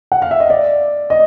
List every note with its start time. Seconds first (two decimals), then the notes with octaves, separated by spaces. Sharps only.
0.12 F#5
0.22 F5
0.31 E5
0.40 D#5
0.50 D5
1.10 D#5